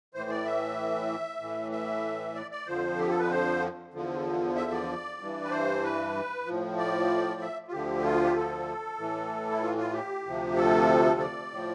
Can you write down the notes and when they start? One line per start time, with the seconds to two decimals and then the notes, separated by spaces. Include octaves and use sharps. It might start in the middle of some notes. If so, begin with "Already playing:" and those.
0.14 A2 E3 C5
0.30 D5
0.45 E5
1.40 A2 E3
1.72 E5
2.35 D5
2.51 D5
2.67 F2 D3 F3 C5
2.99 G4
3.09 A4
3.19 B4
3.30 C5
3.94 E2 D3 F3
4.56 E5
4.72 D5
5.19 G2 E3
5.44 B4
5.51 C5
5.83 B4
6.46 A2 F3
6.78 D5
7.41 E5
7.68 F4
7.72 D2 D3 F3 G4
8.04 F4
8.24 G4
8.36 A4
8.99 A2 E3
9.51 E4
9.62 F4
9.77 F4
9.93 G4
10.26 D2 C3 F3
10.56 A4
11.20 D5
11.51 A2 F3